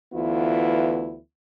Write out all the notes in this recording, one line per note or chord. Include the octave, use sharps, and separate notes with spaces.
D2 E3 B3 E4 F4